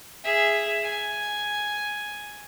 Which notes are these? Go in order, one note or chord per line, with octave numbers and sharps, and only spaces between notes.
G#4 E5
G#5